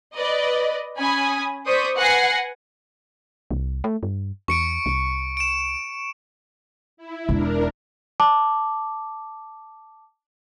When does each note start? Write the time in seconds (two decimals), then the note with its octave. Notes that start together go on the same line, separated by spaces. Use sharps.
0.14 B4 D5 D#5
0.98 C#4 G#5 B5 D#6
1.66 C5 D5 C#6 D#6 G6 B6
1.97 B4 F#5 G#5 A#6 C7
3.51 C2
3.84 A3
4.03 G2
4.48 E2 C#6 C#7 D7
4.86 C2
5.37 D7 E7
6.97 E4
7.29 E1 D4 A#4
8.20 A5 D6